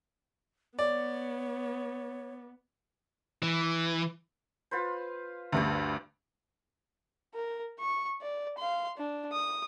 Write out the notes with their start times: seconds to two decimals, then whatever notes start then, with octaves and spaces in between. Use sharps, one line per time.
0.79 B3 C#5 D5
3.43 E3
4.71 F4 B4 C5
5.52 D2 G2 A3 G4
7.34 A#4
7.79 C#6
8.22 D5
8.58 F5 C6
8.97 D4
9.32 D#6